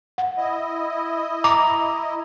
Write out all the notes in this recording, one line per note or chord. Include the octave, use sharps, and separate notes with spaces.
F#5
E4 D#5
A#5 D6